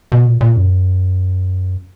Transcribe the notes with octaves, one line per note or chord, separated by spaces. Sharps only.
B2
A#2
A#2
F#2